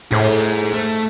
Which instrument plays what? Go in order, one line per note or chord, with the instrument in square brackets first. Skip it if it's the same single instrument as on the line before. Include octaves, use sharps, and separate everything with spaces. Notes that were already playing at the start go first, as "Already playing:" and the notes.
[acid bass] A2 [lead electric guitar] G#4 C5
[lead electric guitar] A3